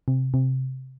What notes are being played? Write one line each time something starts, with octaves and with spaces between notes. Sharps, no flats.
C3
C3